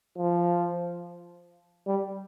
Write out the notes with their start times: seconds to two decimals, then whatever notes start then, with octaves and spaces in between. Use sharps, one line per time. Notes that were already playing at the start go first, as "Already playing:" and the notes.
0.18 F3
1.87 G3